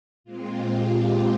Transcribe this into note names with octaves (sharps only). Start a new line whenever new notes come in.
A#2 G#3 C4 F4
G4